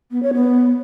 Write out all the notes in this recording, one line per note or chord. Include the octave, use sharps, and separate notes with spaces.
B3
C#5
B3